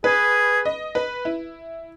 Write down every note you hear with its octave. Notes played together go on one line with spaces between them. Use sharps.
G#4 B4
D#5
B4
E4